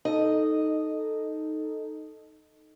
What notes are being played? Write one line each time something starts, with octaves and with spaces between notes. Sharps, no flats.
D#4 A4 D#5